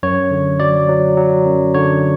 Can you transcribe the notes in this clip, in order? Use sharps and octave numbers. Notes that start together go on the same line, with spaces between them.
F#2 C#5
D3
F#3 D5
F#3
F#3
F#2
D3 C#5